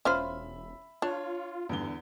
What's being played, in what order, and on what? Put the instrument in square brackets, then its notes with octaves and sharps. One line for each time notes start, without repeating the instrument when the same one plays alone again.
[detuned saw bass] E1 [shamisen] C#4 F4 C5 [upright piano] E5 B5
[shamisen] D4 [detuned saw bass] F4 [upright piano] C#5
[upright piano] E2 D3 G7 [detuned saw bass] G2